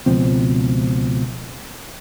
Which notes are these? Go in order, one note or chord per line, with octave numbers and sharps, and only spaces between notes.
C#2 B2 F3 C4